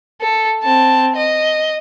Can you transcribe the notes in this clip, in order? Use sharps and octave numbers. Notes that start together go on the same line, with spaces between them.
A4
C4 A5
D#5